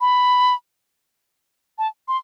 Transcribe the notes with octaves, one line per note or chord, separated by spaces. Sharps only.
B5
A5
C6